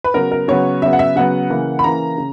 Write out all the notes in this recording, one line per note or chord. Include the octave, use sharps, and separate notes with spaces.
B4
C#3 F#3 B3 A#4
A#4
C#3 F#3 B3 C#5
C#3 F#3 B3 E5
F#5
E5
C#3 F#3 B3 F#5
C#3 E3 A#3
B5
C#3 E3 A#3 A#5
C#3